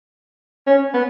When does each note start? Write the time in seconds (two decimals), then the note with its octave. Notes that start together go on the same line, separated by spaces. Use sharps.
0.67 C#4
0.94 B3